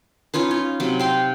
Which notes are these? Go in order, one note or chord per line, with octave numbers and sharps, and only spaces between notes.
C#4 D#4 F4 B4
F4
C3 F#3
F5 G5 C6